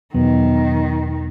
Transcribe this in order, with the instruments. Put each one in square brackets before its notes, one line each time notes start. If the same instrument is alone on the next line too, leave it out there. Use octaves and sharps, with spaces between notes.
[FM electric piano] E2 B2 F#3 B3 [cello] D#3